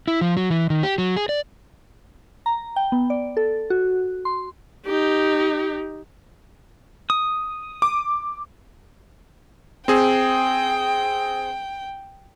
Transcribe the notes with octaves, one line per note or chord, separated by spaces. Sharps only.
E4
F3
F#3
E3
D#3
G4
F#3
G#4
D5
A#5
G5
B3
D5
A4
F#4
C6
D#4 G4
D#6
D6
C4 G#4 G5